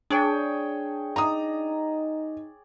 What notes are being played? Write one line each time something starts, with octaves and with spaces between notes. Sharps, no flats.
D4 G#4 C#5 G5
D#4 D5 A#5 D#6